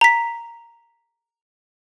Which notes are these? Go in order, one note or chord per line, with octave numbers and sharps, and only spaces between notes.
A#5 B6